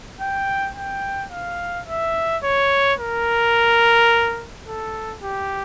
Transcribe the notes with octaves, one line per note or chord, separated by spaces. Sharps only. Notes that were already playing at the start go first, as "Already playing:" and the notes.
G5
G5
F5
E5
C#5
A#4
A4
G4